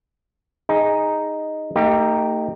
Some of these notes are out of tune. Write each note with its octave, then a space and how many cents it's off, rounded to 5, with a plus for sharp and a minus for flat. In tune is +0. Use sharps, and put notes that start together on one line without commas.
D#4 +0 G#4 -10
A3 +45 D#4 +0 G4 +0